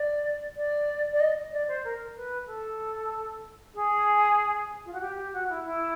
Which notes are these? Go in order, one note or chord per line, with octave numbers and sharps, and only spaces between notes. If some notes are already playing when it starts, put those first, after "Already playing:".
Already playing: D5
D5
D5
D#5
D5
C5
A#4
B4
A4
G#4
F4
F#4
G4
G4
F#4
E4
E4